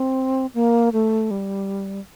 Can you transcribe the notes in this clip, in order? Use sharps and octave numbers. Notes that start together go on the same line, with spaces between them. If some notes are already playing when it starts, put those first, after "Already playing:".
Already playing: C4
A#3
A3
G3